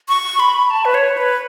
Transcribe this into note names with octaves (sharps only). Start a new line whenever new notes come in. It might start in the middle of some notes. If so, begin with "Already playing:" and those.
C#6
B5
A5
B4
C#5
B4